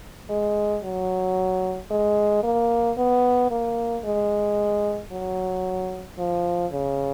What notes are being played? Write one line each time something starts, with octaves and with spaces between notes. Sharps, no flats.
G#3
F#3
G#3
A#3
B3
A#3
G#3
F#3
F3
C#3